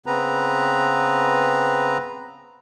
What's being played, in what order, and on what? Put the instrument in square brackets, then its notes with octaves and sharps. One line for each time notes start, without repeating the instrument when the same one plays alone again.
[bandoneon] C#3 B3 C4 B4 A#5